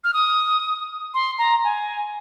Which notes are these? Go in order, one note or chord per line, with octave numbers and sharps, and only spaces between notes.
F6
D#6
C6
A#5
G#5